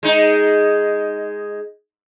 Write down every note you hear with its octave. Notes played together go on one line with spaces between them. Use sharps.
G#3 D#4